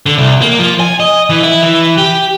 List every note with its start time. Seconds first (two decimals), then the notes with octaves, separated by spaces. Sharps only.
0.06 D3
0.18 C2
0.42 A#3
0.59 F3
0.80 G#5
1.00 D#5
1.30 E3
1.43 E4
1.62 E3
1.98 G4